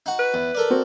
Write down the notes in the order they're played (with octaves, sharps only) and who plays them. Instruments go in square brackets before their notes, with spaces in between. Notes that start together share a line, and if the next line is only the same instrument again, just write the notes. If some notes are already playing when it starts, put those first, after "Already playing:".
[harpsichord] D#4 F#4
[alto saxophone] B4
[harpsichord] E2
A4 A#4 D5
[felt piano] C4 F#4